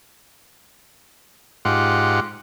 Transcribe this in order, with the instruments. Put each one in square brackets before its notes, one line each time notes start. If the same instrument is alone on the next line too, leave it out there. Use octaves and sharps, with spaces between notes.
[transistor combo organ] G#2 F4 G4 F#5